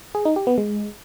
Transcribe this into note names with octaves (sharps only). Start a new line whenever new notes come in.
G#4
D#4
G4
B3
G#3